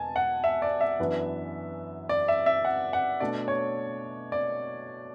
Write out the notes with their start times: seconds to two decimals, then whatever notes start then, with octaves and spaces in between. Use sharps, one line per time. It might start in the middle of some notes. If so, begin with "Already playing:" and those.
Already playing: E2 B2 G#5 A5
0.16 F#5
0.44 E5
0.62 D5
0.81 E5
1.00 F#2 E3 B3 D4
2.09 D5
2.28 E5
2.46 E5
2.65 F#5
2.93 F#5
3.20 B2 A3 D4 D5
3.48 C#5
4.32 D5